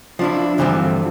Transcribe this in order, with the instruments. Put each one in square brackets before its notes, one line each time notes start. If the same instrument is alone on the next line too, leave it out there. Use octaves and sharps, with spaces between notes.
[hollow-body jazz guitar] F3 D4 E4
D2 G2 E3 F3 G3 C4